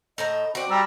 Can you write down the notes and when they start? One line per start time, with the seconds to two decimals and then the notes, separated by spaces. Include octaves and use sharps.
0.18 A2 C5 D#5 A#5
0.55 C4 F#4 D5
0.70 G3 G4 A#5 E6